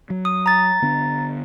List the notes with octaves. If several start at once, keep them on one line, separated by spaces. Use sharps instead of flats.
F#3
D#6
A#5 A6
D3 B3 D4